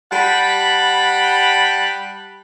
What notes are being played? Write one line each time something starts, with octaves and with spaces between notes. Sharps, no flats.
G3 F#5 A5 B5